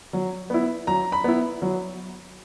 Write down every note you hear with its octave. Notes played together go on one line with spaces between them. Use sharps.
F#3
B3 E4
F#3 A#5
B5
B3 E4
F#3